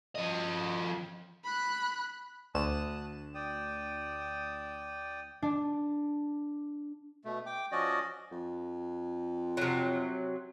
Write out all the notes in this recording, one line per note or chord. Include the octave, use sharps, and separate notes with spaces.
F3 D#5
B5 F#6
D2 A5 D#6 F#6 E7
D5 G5 D#6
D4
B2 A3
G5 D6
F3 C#4 F#4 D5 D#5
F2
C3 F#3